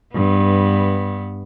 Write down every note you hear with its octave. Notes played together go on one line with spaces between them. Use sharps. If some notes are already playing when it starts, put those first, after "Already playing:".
G2 B3